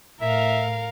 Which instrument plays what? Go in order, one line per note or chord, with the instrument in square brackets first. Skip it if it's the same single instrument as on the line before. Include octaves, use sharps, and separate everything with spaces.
[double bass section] A2 [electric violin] A#4 F5 [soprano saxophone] E5